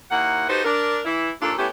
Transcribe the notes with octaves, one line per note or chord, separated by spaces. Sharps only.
D#2 A#3 E4 F#5
D#4 F#4 G4 A4 B4 C5
D4 A#4
E3 E4
D#2 A#2 D4 F4 A4
A3 B3 C#4 E4 G4